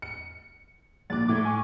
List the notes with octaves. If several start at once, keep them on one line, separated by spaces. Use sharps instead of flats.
C#7
A#1 D6 F#6 A6
A2 E4 D6 G#6
G#5 C#6